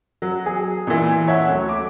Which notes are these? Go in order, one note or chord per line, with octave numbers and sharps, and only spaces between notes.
F#3
G#4
A#2 E3
C#5 E5 F#5
D2 F#3
D6